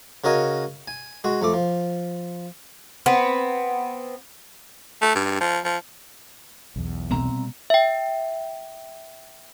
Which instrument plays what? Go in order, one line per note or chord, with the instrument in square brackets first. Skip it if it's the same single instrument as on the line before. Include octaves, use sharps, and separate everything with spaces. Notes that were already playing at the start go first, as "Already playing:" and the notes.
[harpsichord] C#3 F#4 A#4 D#5 G#5
G#5
G#3 F#4
F2 A3 D6
F3
[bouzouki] B3 C4
[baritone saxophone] A3
G2
F3
F3
[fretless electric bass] B1 E2
[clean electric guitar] C2 C4 A#5 [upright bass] B2 G3
[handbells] E5 G5